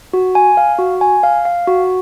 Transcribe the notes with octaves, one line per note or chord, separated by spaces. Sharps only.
F#4
G#5
F5
F#4
G#5
F5
F5
F#4